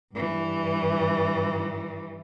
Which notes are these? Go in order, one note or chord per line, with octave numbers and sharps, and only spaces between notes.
G2 E3